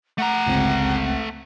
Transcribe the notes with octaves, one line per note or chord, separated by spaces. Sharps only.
A3 F#5 A#5
G1 C#2 C4